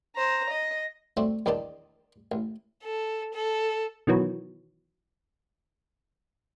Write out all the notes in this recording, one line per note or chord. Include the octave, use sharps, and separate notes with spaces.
C5 A#5
D#5
A3 C4 D4 F#4
A#1 E2 D#3 D#4 D5 A5
A1
A4
A4
B2 D#3 E3 F#3